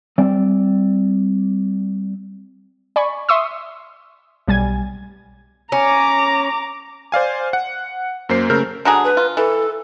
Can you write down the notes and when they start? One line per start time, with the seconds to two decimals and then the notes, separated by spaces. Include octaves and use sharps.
0.18 G3 C4 D5 E5 G5
2.96 D5 G#5 B5 C#6
3.29 E5 C6 C#6 D#6 E6
4.48 B1 G3 G#5 G#6
5.72 C#4 A#5 D6
7.12 C5 D5 F5 G#5
7.53 F#5
8.29 F#2 A#3 C5 C7
8.50 C#3 A3 A#4 E6 F6 G6
8.85 D3 F#3 G#4 A#5
9.04 B4
9.17 F4
9.37 E3 A4